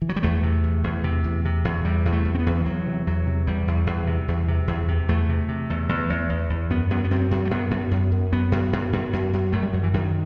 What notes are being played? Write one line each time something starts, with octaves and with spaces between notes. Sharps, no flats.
E3
F#3
G3
E2 A3
C3
E2
E2
C3
E2
C3
E2
C3 G3
E2
A3
E2
C4
B3
E2
E3
E2 F#3
C3
E2 F#3
C3
E2 G3
E2
E2
C3
E2
C3
E2
C3
E2 A3
C3
C3
E2
E2
E2
E2
E2
F#2 B3
F#2 B3
B3
F#2 C4
F#2
A3
F#2 B3
F#2
F#2
F#2
F#2 B3
F#2
F#2
F#2
F#2
F#2
F#2 A3
G3
F#2 F#3
E3
F#2 D#3